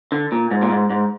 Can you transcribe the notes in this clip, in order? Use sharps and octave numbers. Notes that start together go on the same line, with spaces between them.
D3
A#2
G#2
A#2
G#2
G#2